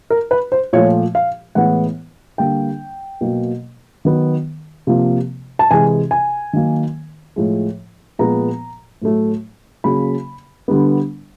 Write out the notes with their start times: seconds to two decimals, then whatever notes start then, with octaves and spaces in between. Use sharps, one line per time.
0.10 A#4
0.31 B4
0.52 C5
0.73 A#2 F3 A3 C#5
1.15 F5
1.55 A2 E3 G#3 B3 F#5
2.38 D3 G3 A#3 G5
3.21 B2 F#3 A#3
4.05 D#3 F#3 B3
4.87 C3 F3 A#3
5.59 A5
5.71 C3 E3 G#3 G#5
6.11 G#5
6.53 D#3 F#3 A#3
7.36 A2 F3 G#3
8.19 A#2 F3 G#3 B3 A#5
9.02 A2 F#3 A3
9.84 C#3 F#3 A#3 B5
10.68 D3 G3 B3